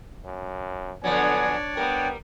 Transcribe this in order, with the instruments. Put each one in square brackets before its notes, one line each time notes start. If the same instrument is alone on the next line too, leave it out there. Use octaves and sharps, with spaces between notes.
[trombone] F#2
[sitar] D3 F3 F#3 [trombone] B3 [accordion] D4 C#5 D5 [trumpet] G#5
[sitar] G3 A#4 [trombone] B3 [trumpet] G5